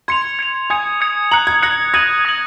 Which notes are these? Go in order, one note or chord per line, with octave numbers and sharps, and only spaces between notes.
C6 G#6 C#7 F7
G#6 C#7 F7
G#5 D#6 G#6 C#7
D#6 G#6 C#7
A#5 F#6 C#7 F#7
G#6
F#6 A#6 C#7 F#7
D#6 G#6 A#6 D#7 F#7
D#6 A#6 D#7 F#7